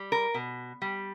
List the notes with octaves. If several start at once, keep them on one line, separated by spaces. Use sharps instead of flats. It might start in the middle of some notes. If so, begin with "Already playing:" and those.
Already playing: G3
A#4
B2
G3